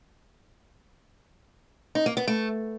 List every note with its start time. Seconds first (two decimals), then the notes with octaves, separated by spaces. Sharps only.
1.95 D#4
2.06 A#3
2.17 B3
2.27 A3